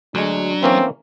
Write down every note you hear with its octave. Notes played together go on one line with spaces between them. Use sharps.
D2 F#3 G#3 D4
E3 A#3 C4 C#4